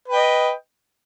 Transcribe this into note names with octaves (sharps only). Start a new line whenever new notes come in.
B4 D#5 G5